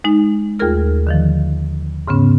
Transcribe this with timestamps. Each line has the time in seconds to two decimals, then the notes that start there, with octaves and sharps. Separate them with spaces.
0.04 G#3 D#4
0.59 D#2 A3 F4 G#4 A#4 F6
1.07 D3 D#3 F3
2.07 G#2 C#3 B3 C#4